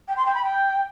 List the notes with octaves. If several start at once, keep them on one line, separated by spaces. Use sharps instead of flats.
G5
C6
G5
B5
G5